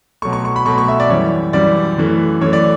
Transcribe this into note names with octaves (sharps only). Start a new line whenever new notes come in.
B2 F#3 A3 C#6
C#6
C#6
B5
B2 F#3 A3 C#6
C#6
E5
D5
F#2 E3 G3 C#5
F#2 E3 G3 D5
F#2 E3 A3
F#2 E3 A3 C#5
D5